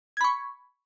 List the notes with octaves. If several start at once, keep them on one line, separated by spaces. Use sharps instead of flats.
B5 C#6 G#6